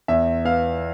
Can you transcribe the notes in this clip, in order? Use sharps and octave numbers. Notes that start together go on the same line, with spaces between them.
E2 E5
B3 F5